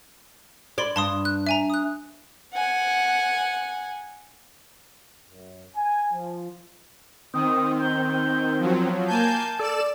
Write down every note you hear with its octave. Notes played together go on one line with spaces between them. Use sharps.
D5 B5 C6 G#6
G2 A5 C6 D#6
F#6
E5 G#5 A#5
D#6 F#6
F#5 G#5
F#2
G#5
F3
D#3 C4 D#6
G6
F3 F#3
A#3 G#5 A5 G6
A4 D5 E7